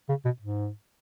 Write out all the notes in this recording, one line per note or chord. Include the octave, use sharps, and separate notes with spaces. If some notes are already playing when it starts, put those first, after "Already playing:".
C#3
B2
G#2